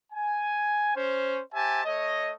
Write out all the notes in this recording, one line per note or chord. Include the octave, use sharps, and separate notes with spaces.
G#5
C#4 C5
G4 C5 E5 G#5 A5
A3 C#5 D#5